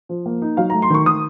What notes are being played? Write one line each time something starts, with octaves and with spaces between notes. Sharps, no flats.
F3
A#3
D#4
F#3 F5
A3 A#5
C6
D#3 C#6
D#3 D#6